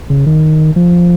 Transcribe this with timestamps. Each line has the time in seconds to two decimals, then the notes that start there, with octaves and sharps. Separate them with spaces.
0.10 C#3
0.26 D#3
0.76 F3